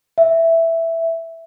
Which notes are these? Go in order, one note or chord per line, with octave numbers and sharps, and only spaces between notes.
E5